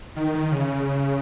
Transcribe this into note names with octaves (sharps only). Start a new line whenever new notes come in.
D#3
D#3
C#3